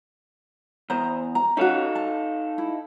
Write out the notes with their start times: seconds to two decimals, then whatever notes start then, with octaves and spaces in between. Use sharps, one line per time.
0.90 E2 C5 A#5
1.35 A#5
1.57 C#4 D#4 F#4 A4 F5
1.95 A5
2.58 E4